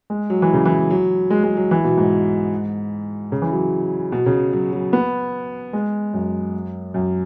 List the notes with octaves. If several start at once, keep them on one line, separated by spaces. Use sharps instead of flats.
G#3
F#3
E3
C#3
E3
F#3
G#3
G#3
F#3
E3
B2
G#2
C#3
E3
F#3
B2
C#3
F#3
F#3
B3
G#3
F#2
F#2